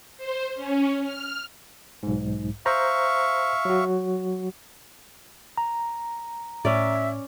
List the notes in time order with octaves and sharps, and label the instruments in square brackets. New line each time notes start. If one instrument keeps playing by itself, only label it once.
[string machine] C5
C#4
F6
[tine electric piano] B1 G#2
[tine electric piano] C5 A#5 [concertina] E5 F5 C#6
[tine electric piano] F#3 F#4
A#5
[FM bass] A2 [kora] C#4 D5 [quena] E5